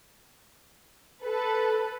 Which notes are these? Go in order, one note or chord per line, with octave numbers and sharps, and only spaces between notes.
A4 B4